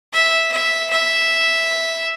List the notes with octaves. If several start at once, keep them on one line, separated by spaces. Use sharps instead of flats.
E5
E5
E5